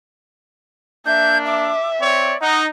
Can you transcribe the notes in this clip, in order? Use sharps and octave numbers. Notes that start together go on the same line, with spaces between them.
A#3 D4 E5 G6
E5 D6
C4 C#5 D5
D#4 F#5